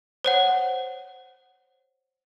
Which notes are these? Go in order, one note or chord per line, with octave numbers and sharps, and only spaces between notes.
C5 C#5 F#5